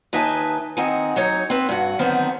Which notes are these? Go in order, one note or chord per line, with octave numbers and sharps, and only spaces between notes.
D#2 D#4 B4 E5 G#5 A5
D#3 C4 D#4 F#5 G#5
F#3 D#4 C#5 A#5
C4 B4
G2 F#4
D3 D#3 F#3 B3 C4